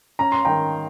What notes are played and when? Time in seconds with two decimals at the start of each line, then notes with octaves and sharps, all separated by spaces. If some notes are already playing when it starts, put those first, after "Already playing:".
0.19 C#4 A#5
0.32 C6
0.45 D#3 G5 A#5